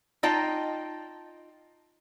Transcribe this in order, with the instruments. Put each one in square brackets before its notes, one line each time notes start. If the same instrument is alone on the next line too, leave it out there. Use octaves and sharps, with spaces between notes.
[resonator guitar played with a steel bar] D#4 F4 D#5 G5 A5